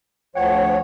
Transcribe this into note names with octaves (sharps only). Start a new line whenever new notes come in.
D2 F3 C#5 F#5 G5